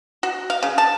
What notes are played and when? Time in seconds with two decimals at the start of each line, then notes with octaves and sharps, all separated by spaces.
0.23 F#4
0.50 F5
0.63 C#3
0.78 A5